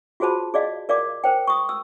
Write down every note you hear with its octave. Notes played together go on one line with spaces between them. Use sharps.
F4 F#4 G#4 C5 A5 B5
G#4 D5 D#5 F5
A#4 D5 F5 D6
A#4 C5 G5
C#6 D#6
E6